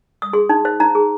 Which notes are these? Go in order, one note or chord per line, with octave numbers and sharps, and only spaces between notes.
D#6
G#4 C6
D#4
C5
D#4 A#5
G#4